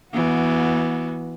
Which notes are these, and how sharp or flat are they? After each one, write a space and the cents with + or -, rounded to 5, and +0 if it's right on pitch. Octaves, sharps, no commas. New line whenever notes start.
E3 +0 B3 -25 F#4 -15